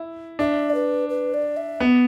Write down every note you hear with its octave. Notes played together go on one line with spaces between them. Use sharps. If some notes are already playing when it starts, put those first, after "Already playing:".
Already playing: E4
D4 E5
D5
B4
B4
D5
E5
B3